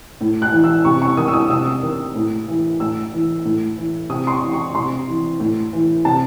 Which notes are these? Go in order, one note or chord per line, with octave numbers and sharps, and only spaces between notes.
A2
F#6
E3
E6
C3 C#6
C#6
D#3 D#6
E6
D#6
C3 E6
D#3
A2
E3
A2 E6
E3
A2
E3
C3 D#6
C6
C#6
E3
C#6
C3 C6
E3
A2
E3
C3 A5